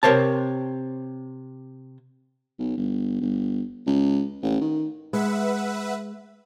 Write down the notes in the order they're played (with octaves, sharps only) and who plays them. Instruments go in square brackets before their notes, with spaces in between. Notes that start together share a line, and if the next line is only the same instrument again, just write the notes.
[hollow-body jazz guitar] C3 A#4 C5 C#5 A5
[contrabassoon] B1
G1
G1
C#2
A1
D#3
[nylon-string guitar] G#3 [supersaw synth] B4 E5 F#5